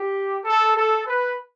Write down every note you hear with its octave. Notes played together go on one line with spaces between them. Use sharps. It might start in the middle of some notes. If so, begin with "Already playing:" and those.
Already playing: G4
A4
A4
B4